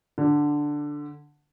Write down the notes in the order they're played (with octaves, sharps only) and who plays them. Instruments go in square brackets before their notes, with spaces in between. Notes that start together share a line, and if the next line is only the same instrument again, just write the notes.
[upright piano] D3